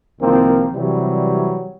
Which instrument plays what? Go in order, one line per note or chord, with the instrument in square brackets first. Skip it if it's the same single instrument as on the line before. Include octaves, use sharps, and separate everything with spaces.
[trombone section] C2 D#3 F3 A#3 C4
C3 E3 F#3 G3